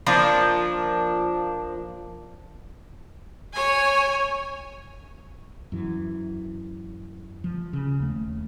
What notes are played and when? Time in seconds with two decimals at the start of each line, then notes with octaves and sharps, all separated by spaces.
0.07 F3 A#3 D4
3.53 C#5 G#5
5.72 F#2 E3
7.44 F3
7.73 C#3
8.00 D#2 A3